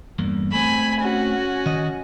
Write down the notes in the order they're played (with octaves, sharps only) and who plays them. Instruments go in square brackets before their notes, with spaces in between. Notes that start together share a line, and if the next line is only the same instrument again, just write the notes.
[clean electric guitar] E2 G2 A#3
[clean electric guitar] A3 C4 [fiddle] G#5 B5
[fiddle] C#4 F#4
[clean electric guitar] D#3 D#5